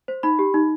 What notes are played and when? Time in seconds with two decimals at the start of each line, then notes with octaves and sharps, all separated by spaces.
0.08 C5
0.23 D#4 B5
0.39 G4
0.54 D#4